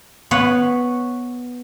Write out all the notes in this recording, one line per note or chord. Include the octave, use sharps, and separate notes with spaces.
B3 C#5 F#5